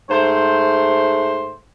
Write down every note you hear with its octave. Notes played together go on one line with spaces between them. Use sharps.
G#2 A3 C5